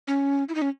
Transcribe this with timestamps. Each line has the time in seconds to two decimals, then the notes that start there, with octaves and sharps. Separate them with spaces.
0.07 C#4
0.49 E4
0.55 D#4
0.62 C#4